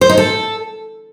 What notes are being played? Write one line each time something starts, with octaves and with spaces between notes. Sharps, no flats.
C5
D#4
A4